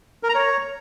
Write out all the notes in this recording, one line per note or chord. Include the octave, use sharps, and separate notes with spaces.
A#4
A#5
C#5